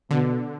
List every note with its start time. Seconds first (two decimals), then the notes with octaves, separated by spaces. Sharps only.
0.11 B2 D3